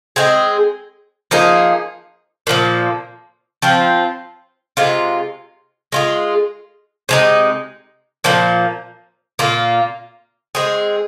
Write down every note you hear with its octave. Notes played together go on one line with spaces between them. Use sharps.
G#3 C4 G#4
F3 A#3 D#4 G#4
A#2 F3 A#3
F3 C4 F4
C3 G#3 F4
G#3 F4 G#4
C3 G#3 D#4
A#2 F3 A#3
A#2 A#3 F4
G#3 C4 G#4